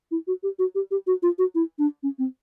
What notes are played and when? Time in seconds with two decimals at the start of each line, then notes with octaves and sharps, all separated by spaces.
0.11 E4
0.27 F#4
0.43 G4
0.59 F#4
0.75 G4
0.91 G4
1.07 F#4
1.23 F4
1.39 F#4
1.55 E4
1.79 D4
2.03 C#4
2.19 C4